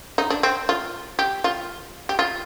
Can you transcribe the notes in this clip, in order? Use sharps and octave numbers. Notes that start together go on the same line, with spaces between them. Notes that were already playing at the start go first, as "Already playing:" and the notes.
D#4
D4
C4
F4
G4
F4
G4
F4